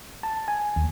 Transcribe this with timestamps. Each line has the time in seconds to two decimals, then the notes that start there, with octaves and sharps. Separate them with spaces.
0.23 A5
0.48 G#5
0.76 D#2